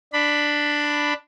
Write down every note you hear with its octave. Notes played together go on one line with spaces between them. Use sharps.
D4 B5